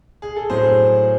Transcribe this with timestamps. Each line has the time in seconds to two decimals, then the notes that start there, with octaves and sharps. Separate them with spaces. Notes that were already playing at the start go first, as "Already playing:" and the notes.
0.22 G#4
0.36 A4
0.50 A2 F#3 G#4 C5